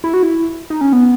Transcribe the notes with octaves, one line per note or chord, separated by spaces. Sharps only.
E4
F#4
E4
D#4
C#4
B3